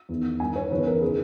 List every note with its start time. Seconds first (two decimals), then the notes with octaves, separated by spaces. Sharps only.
0.09 E2 D#3
0.40 G2 D#3 G#5
0.56 C#5
0.71 E2 C#3 E3 B4
0.87 A#4
1.02 D#3 G#4